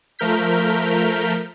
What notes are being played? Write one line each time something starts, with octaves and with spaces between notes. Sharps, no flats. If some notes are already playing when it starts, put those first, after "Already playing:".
F3 A3 A#4 F6 G6 B6